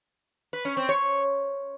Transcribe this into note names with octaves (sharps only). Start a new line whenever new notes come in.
B4
C#4
C4
C#5